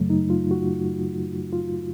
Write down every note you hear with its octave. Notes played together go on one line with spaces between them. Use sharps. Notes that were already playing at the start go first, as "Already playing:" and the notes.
Already playing: F#2 C#3 F#3 A3
D#4
F4
F#4
F4